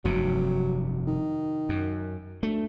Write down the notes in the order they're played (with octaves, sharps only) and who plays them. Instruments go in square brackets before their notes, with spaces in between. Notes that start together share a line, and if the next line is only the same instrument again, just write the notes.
[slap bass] F1 G2 C3 [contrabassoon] F#3
[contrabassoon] D#3
[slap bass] F#2
[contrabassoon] D2 [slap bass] A3